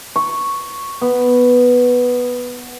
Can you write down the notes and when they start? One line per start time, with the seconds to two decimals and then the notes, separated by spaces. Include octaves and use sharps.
0.16 C#6
1.01 B3